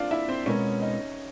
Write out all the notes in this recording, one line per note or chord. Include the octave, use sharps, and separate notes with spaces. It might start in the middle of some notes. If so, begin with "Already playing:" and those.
Already playing: C4 D4 F4 F5
E4 E5
C4 C5
B2 G#3 C4 C#4 F4 A#4 C#5
D#4 D#5